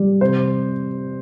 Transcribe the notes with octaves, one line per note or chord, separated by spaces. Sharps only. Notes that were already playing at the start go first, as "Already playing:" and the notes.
Already playing: G3
C3 C5